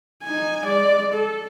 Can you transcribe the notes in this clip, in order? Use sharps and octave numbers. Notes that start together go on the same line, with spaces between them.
D#4 G#5
G#3 D5
A4